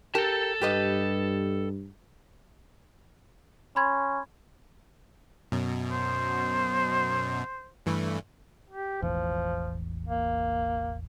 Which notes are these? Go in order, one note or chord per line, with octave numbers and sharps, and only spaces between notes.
G4 A4 A#4 A5
G2 G4 B4 D#5
C#4 B5 C6 G#6
F#2 B2
C5
G2 E3 A3
G4
E1 A1 E2 F3
A#3